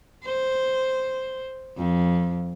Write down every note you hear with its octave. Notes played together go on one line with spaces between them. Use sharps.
C5
F2